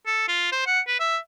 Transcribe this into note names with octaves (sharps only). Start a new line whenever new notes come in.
A4
F4
C5
F#5
B4
E5